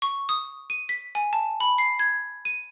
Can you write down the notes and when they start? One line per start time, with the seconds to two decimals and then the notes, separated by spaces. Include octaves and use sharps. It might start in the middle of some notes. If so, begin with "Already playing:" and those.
0.02 C#6
0.29 D#6
0.70 D#7
0.89 B6
1.15 G#5
1.33 A5
1.60 B5
1.78 C7
1.99 G#6
2.45 D#7